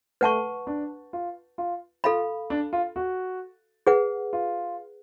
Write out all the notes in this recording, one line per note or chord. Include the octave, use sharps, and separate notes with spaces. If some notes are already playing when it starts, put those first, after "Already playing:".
A3 B4 F#5 A5 C#6
D4
F4
F4
F4 A4 F5 B5
D4
F4
F#4
G#4 B4 F#5
F4